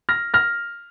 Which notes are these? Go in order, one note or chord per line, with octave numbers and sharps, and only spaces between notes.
F6 A#6
F6 A#6